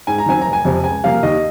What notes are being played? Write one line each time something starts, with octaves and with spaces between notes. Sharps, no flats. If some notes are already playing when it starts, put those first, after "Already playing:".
G#2 G#5
A#5
D#3 F#3 C4 G#5
F1 A#5
G#5
F2 C3 F3
C#2 G#5
C3 F3 A#3 F5
D#2 D#5